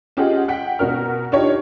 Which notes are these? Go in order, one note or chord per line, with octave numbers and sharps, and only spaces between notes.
C#4 F4 G4 G#4 D#5 F#5
F#5 G5 B6
B2 F#4 A#4 F6
D4 D#4 F4 G4 C#5